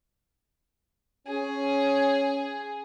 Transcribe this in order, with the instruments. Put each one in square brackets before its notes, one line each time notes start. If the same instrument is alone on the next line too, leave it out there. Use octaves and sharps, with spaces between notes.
[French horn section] C#4 [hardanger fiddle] G#4